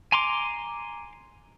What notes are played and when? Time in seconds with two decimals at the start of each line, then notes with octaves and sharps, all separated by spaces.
0.12 G#5 A#5 C6 D6